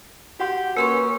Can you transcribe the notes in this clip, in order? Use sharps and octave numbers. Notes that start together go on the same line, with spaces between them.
F#4 G4 F#5 C6
A#3 C#4 A#4 B4 C6 C#6